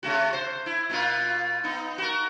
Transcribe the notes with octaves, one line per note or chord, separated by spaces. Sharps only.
C3 A3 F#4
C5
E4
B2 A#3 F4
B3 D#4
F#4 A#4